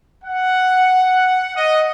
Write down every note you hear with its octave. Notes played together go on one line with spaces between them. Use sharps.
F#5
D#5